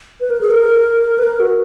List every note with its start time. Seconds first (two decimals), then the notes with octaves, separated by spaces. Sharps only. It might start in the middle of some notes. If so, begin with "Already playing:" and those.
0.21 B4
0.30 A#4
0.41 G#4
0.51 A#4
1.18 B4
1.24 A#4
1.40 F#4